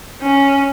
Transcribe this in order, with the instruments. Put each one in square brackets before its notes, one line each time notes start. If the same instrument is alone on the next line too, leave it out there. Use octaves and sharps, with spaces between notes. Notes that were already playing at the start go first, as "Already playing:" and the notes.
[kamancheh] C#4